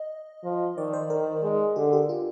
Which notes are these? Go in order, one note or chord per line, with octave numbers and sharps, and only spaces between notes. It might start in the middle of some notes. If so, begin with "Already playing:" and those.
Already playing: D#5
F3
D#3 D5
C5
D#3 A#4
G#3
D3 G4
G4
F4